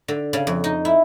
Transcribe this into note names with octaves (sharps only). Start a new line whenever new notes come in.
D3
C#3
F2
D#4
E4